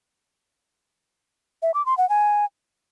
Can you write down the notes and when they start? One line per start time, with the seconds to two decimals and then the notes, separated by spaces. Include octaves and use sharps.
1.62 E5
1.74 D6
1.86 C6
1.98 F#5
2.09 G#5